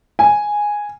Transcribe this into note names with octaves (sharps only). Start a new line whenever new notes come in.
G#5